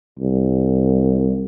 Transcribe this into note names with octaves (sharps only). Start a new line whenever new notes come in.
C2